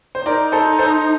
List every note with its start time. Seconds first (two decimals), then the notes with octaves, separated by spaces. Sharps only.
0.15 C5
0.26 D#4 A#4 D5
0.52 A4 C5
0.79 A4 C5